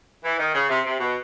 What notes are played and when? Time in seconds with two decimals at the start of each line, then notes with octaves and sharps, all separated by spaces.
0.25 E3
0.39 D#3
0.55 C#3
0.69 C3
0.86 C3
1.00 B2